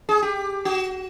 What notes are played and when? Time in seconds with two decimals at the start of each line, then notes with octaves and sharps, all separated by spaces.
0.09 G#4
0.22 G4
0.65 F#4